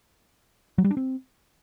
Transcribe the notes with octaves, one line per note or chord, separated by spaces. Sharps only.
F#3
G3
D4
C4